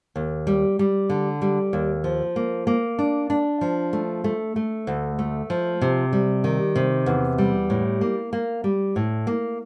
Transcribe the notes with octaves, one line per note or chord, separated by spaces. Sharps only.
D#2
G3
G3
D3
G3
D#2
F3
A#3
A#3
D4
D4
F3
A3
A3
A3
D2
A3
F3
C3
G3
D#3
C3
E2
G3
A2
A#3
A#3
G3
A2
A#3